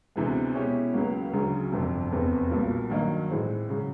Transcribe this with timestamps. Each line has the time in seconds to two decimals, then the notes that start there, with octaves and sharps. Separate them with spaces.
0.16 D2 C3 E3 G#3 B3
0.54 B2 G#3 C#4 E4 G4
0.94 C#2 C#3 F#3 A#3
1.33 D2 C#3 F#3
1.72 G1 F2 C3
2.11 F1 E2 C3
2.51 B1 A#2 G3 A#3
2.90 G2 D#3 F#3 A#3 D#4
3.30 A2 E3 G#3 C4
3.69 C#3 F#3